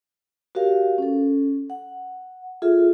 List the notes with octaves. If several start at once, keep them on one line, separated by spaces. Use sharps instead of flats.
F#4 G4 A#4 C#5 F5
C#4 A4
F#5
F4 G#4 A4 E5